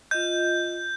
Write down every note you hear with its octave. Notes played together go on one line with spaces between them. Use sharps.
F4 D#5 G6